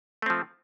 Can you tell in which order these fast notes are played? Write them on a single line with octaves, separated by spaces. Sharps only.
A3 C4 F3